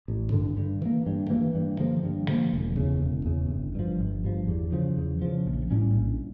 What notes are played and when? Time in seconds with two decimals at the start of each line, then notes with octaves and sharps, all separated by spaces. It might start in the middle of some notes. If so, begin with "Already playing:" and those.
0.08 A1
0.32 G2 D3
0.57 G2
0.82 E3 A#3
1.06 G2
1.30 E3 A#3
1.55 G2
1.80 D3 F3 A#3
2.03 G2
2.28 D3 F3 A#3
2.53 E1
2.77 E2 C#3
3.02 E1
3.26 E2 C#3
3.50 G1
3.75 G2 F3
3.99 G1
4.24 G2 F3
4.48 E2
4.72 C#3 F3
4.98 E2
5.22 C#3 F3
5.46 A#1
5.71 A2 G3 C#4
5.94 A#1